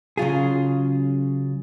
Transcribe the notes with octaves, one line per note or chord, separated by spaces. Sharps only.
C#3 F#3 F4 G#4